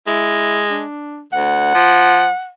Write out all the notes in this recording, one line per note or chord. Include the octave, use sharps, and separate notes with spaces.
G#3 E4
D4
D2 F#5
F3